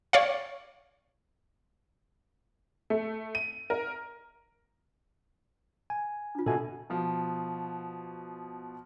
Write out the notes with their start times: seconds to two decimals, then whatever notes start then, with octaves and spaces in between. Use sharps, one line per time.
0.13 C#5 D5 F5
2.90 A3
3.35 D#7
3.70 A#4
5.90 G#5
6.35 D4 F4
6.46 B2 A4 E5 G#5
6.90 B2 F3